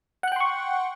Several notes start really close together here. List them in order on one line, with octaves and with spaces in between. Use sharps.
F#5 F#6 G5 C6 C#6